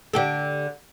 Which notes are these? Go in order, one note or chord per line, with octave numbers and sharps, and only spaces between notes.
D3 G4 A4